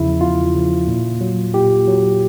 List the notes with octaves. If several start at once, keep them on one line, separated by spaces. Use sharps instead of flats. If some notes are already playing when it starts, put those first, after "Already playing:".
Already playing: E2 C#3 F3 E4
E2 F4
C#3 F3
A#2
F#3
A#2 G4
F#3